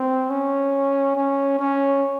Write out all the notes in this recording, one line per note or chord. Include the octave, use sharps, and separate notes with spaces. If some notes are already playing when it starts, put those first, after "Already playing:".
Already playing: C4
C#4
C#4
C#4